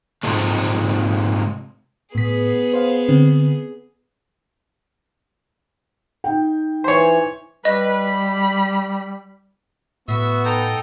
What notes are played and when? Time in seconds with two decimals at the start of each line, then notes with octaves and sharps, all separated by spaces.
0.23 G#2 C3 F3 G#3 A3
2.15 A2 B3 G#4 B6
2.74 C5 F5
3.09 D3 C4
6.24 D#4 G5
6.84 E3 C5 C#5
7.65 G3 B4 D#5
8.04 B5
10.08 A2 B3 F#4 E5
10.45 D#4 A4 G5 A#5